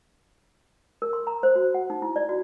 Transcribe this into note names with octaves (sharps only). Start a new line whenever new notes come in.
A#4
C6
A#5
C5
F#4
F#5
D#4
E4
D5
F#4